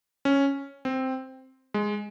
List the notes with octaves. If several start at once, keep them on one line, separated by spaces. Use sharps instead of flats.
C#4
C4
G#3